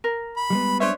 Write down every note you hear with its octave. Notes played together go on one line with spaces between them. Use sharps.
A#4
B5
G3 G#3 B3
D4 C5 C#5 E5